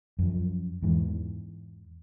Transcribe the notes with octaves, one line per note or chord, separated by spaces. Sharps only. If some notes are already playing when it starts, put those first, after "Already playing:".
F#2 F3
E2 G#2 E3